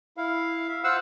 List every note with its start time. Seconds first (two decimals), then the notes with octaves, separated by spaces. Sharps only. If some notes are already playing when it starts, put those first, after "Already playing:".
0.17 E4 F5
0.68 E5
0.84 F4 C5 F5 F#5 E6